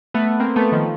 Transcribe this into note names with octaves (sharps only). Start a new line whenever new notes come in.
A3 B3
A#3 C4
A3 B3
D#3 F3